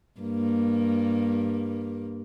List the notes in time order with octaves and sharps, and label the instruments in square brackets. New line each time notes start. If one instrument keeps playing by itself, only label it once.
[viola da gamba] G2 A#3